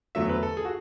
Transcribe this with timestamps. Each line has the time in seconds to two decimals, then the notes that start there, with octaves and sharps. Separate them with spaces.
0.15 E2 D3 F#3 A3 E5
0.29 B4
0.43 A4
0.57 G#4
0.65 F#4